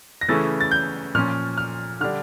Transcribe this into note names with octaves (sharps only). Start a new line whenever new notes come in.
A#6
C#3 E3 A3 C#4 E4 A6
A6
G6
A#2 F3 C#4 F6
F6
D3 G3 D4 F6